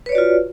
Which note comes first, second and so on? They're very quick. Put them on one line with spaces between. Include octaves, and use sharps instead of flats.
B4 C#5 D5 F#4 F4